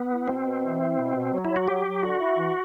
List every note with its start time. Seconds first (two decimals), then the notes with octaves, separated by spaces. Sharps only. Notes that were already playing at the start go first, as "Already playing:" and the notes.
Already playing: B3
0.10 E4
0.28 B2 C4
0.45 B2
0.63 E3
0.80 E4
0.97 B2
1.15 B2
1.33 F#3
1.45 E4
1.50 F#3
1.56 F#4
1.68 F#3 G4
1.85 F#3
2.03 D3 F#4
2.20 E4
2.38 E3